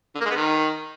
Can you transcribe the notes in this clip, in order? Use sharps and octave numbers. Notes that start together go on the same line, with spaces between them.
D3
A#3
G#3
B3
D#3